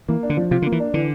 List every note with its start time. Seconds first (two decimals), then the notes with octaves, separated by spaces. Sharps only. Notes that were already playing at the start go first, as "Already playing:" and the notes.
0.08 E3 A#3
0.23 D4
0.30 D3
0.37 F3
0.51 C3 F4
0.62 D3
0.66 A#3
0.72 E3
0.80 D4
0.94 D3 E3